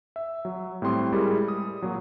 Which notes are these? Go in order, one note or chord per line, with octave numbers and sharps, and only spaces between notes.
E5
F#3
A2 G3 C4 C6 D#6
G3 G#3 E4 G4 G#4 A#4
D#6
A#2 F#3